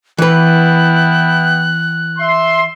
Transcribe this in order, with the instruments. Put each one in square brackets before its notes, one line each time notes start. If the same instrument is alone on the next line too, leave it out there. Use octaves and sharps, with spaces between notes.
[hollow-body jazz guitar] E3 B4 [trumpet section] B3 E4 G5 [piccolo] F#6
[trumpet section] E5 C6